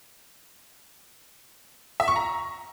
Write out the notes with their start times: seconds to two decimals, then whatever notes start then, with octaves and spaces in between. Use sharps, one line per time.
2.00 E5
2.08 C#6
2.16 A#5